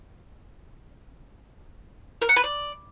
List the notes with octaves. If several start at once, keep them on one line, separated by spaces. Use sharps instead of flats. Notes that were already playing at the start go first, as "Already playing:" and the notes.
A#4
F#5
B4
D5